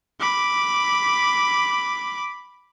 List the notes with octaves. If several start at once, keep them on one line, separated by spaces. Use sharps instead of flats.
B5 D6